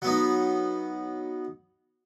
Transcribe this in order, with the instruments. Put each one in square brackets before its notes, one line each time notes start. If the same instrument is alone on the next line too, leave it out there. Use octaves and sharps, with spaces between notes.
[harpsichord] F#3 B3 D#4